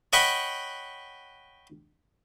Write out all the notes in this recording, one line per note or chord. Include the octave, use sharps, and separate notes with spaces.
C#5 D#5 F#5 G5 B5 C#6